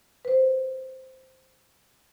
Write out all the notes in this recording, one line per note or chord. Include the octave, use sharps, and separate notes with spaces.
B4 C5